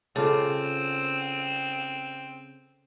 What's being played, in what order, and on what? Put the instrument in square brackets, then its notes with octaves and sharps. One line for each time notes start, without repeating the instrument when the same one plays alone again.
[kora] C#3 F4 [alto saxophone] C4 [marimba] A4 A5 D6